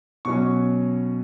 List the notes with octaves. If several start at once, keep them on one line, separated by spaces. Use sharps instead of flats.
B2 F#3 C#4 C#6